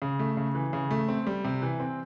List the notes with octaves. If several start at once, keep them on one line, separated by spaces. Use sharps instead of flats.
C#3
A3
C#3
E3
C#3
A3
C4
G3
C3
E3
C4